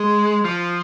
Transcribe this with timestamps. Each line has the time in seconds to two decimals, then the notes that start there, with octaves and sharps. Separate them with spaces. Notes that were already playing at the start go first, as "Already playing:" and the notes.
Already playing: G#3
0.45 F3